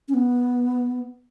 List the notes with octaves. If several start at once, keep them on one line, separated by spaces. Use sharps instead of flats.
C#4
B3